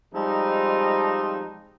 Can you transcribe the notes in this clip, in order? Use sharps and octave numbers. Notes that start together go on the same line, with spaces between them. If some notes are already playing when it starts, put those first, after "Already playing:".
F3 G3 G#3 C4 D#4